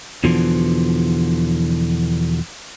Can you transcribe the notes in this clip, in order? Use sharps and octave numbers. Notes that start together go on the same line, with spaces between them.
E2 B2 D3 E3 F3